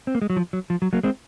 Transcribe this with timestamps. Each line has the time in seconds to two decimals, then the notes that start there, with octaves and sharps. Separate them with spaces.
0.07 C4
0.15 A#3
0.22 G#3
0.30 F#3
0.36 F3
0.53 F#3
0.70 F3
0.82 F#3
0.93 F#3 A#3
1.03 G#3 C4